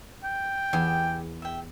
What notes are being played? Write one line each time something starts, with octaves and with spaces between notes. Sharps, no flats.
G5
E2 G4 G#4 E5 G#5
E5 G5